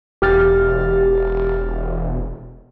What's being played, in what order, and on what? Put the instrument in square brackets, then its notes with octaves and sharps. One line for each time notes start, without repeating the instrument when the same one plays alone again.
[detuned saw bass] E1 [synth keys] G4 F6 A6